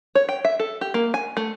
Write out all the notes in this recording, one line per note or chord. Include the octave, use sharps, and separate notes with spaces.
C#5
G5
E5
A4
G4
A#3
G#5
A3